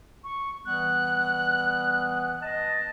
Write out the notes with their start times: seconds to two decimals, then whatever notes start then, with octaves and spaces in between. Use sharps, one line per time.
0.24 C#6
0.66 E3 G3 B3 F#6
2.42 D#5 A5